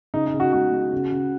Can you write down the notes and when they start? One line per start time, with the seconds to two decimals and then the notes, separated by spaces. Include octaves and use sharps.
0.14 C#3 D#4
0.27 D#4
0.34 C#3
0.40 F#4
0.53 G#3 F#4
0.72 G#3
0.93 C#3
1.12 C#3